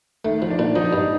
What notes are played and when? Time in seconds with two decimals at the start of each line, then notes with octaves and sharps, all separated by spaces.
0.25 D#3 A3
0.42 F3
0.50 D4
0.59 A#2
0.76 F3 D#4
0.93 G2